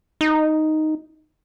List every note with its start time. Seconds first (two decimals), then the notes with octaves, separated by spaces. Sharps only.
0.21 D#4